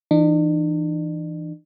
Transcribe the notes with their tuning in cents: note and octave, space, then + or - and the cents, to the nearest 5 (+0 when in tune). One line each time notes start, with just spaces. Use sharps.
E3 +0 D4 +45